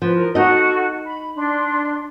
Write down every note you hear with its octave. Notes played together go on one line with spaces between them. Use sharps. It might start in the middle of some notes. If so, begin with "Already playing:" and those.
F3 B4
A#4
D#4 F#4 A4 D#5
B5
D4 C6